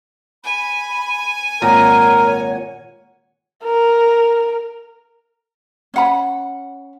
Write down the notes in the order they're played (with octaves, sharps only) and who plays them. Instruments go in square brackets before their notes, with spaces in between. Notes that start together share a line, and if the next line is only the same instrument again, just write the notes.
[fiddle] G#5 [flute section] B5
[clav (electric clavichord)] G#1 A#2 A#5 [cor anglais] A#4 [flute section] C#5 F#5
[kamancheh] A#4
[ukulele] C#4 F#5 B5